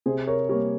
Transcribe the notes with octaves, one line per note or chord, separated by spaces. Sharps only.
C3 G#4 C5
A#4 C#5
G3 A#3 A#4 C#5